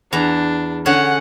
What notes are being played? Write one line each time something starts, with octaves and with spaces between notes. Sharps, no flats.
E2 D4 A#5
D3 C#4 G#4 F#5